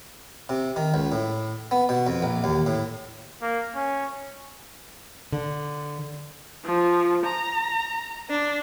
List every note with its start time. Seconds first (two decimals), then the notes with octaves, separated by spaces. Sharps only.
0.49 C3
0.76 D#3
0.94 C#2
1.12 A2
1.71 B3
1.89 B2
2.07 F2
2.22 A#1
2.44 D#2
2.66 A2
3.41 A#3
3.75 C#4
5.32 D3
6.65 F3
7.25 A#5
8.30 D4